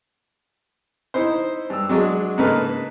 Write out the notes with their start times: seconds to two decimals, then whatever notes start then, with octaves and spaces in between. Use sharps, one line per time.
1.14 D#4 E4 C5
1.70 G2 E6
1.89 F#3 G#3 D4 F#4 G#4
2.38 G#2 C#3 A#3 A4 B4 F6